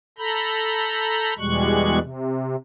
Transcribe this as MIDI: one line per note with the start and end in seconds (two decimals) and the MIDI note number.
0.18 1.34 69
0.18 1.34 82
0.18 1.34 83
0.18 1.34 91
1.38 1.99 40
1.38 1.99 47
1.38 1.99 55
1.38 1.99 56
1.38 1.99 85
1.38 1.99 90
2.00 2.56 48